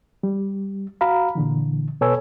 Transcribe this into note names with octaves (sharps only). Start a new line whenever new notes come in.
G3
F#4 F5 A#5 B5
A#2 D3 E3
B2 A4 B4 C#5 G#5 E6